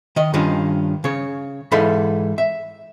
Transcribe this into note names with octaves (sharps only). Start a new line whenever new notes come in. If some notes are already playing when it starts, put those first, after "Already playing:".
D#3 D#5
G2 D#3 C#4 D4 F4
C#3 C#5
G#2 E3 D#4 A4 F5 B5
E5